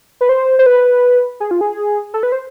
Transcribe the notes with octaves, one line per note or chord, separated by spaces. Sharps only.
B4
C5
C5
B4
G#4
F4
G#4
A4
B4
C5